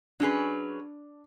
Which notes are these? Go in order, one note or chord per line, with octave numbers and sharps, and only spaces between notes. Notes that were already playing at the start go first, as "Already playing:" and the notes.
F#3 C#4 D4 G#4 B4